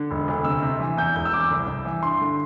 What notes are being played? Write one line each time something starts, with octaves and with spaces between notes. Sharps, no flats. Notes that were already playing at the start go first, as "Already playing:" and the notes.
Already playing: D3
E1
D2
C3 E6
C3
E3
E2 G6
E1 G6
E6
E2 D6
C2
C2
E3
G2 C6
D3